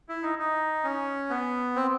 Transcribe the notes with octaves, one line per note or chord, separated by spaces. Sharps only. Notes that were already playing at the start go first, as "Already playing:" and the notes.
E4
D#4
D#4
C#4
B3
C4